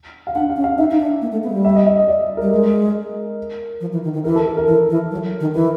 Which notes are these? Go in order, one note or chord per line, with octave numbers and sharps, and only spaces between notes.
F5
D4 F#5
F5
C#4
F5
D#4 E5
D#4
D4
A#3
A3
B3
G#3
G3
E5
D#5
E5
D#5
D5
G3 A#4
G#3 A#4
F3
E3
D#3
D#3
E3 A#4
A4
A#4
A#4
E3 A#4
E3
F#3
D#3
E3 B4